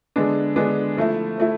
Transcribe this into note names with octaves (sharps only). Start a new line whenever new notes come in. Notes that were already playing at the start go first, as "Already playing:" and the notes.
D3 G#3 B3 D4
D3 G#3 B3 D4
F3 A3 E4
F3 A3 E4